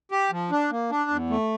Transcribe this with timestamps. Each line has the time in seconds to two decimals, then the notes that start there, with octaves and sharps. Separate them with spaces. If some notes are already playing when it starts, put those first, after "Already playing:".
0.11 G4
0.31 F3
0.51 D4
0.71 A#3
0.91 D4
1.10 E2
1.30 A3